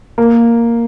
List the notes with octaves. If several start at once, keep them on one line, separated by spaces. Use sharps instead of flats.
A#3